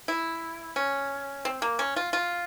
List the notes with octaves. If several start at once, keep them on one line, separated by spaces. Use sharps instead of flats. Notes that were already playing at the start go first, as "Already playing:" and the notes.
E4
C#4
C4
A#3
C#4
F4
F4